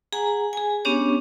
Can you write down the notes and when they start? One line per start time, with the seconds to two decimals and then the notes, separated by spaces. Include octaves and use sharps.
0.13 G#4 F#5 G#5 A#5
0.53 G#4 G#5
0.85 B3 C#4 D4 G4 C#5